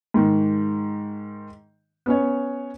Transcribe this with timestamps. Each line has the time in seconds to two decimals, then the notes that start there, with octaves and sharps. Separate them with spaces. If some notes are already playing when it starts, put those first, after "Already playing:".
0.14 G#2 D#3
2.06 B3 C#4 C#5